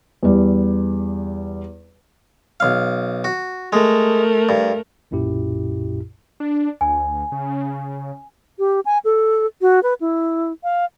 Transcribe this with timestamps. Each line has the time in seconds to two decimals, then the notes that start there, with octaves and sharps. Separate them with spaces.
0.23 E2 G3
2.60 B1 F5
3.24 F#4
3.73 G#3 A3 A#4
4.49 G2
5.11 B1 F#2 A#2 E4 G4
6.40 D4
6.81 D2 G#5
7.32 C#3
8.59 G4
8.85 G#5
9.04 A4
9.61 F#4
9.83 B4
10.01 E4
10.63 F5